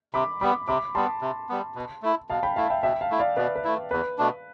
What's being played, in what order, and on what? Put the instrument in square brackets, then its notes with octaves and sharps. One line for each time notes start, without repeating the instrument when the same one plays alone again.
[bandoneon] C3 [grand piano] B5 D6
[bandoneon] G3 B3 [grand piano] B5 D6
[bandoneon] C3 [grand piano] B5 D6
[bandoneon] G3 B3 [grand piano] A5 C6
[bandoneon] C3
G3 B3
B2
A3 E4
[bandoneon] B2 [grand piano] F5 A5
[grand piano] G5 B5
[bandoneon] A3 E4 [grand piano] F5 A5
[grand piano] E5 G5
[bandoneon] B2 [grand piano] E5 G5
[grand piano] F5 A5
[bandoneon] A3 E4
[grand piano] D5 F5
[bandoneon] B2 [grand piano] B4 D5
[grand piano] B4
[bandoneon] A3 E4
[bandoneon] E2 [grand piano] B4
[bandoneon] B2 A3 D4